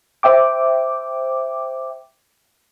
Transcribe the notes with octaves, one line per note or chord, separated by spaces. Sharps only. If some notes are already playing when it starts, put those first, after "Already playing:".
C5 E5 G5 D6